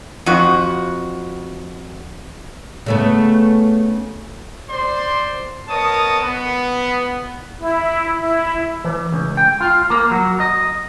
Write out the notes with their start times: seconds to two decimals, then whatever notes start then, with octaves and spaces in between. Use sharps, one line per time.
0.26 F2 F#4
2.86 C#3 A3 B3
4.69 C5 D5 C6
5.68 B3 A#4 C#5 D#5 A5 D#6
6.22 B3
7.58 E4
8.19 E4
8.84 E3
9.12 C#2
9.37 G5
9.60 F4
9.90 A#3
10.11 F#3
10.40 D#5